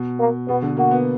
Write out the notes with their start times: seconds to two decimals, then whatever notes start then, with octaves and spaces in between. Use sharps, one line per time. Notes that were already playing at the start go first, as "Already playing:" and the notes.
Already playing: B2
0.19 A#3
0.48 B2 B3
0.62 D3
0.77 A#3 F#4
0.91 B3